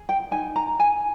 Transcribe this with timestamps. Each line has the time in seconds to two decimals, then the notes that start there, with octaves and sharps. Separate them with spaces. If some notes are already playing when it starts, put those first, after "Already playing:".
Already playing: G#4
0.09 G5
0.31 D#4 G#5
0.56 A#5
0.79 G#4 G#5